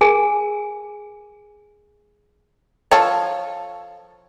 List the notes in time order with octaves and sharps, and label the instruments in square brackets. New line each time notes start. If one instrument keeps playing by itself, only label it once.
[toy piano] G#4 A#4 G#5
[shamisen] F3 A4 C#5